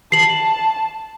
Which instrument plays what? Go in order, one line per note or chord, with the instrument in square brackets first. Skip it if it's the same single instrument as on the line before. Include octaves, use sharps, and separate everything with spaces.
[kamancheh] A5 [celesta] C7 F#7